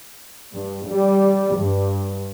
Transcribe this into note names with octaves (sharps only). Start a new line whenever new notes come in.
G2
G3
G2